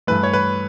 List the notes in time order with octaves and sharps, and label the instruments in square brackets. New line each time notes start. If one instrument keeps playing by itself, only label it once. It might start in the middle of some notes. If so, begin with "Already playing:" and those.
[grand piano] G2 E3 A3 B4
C#5
B4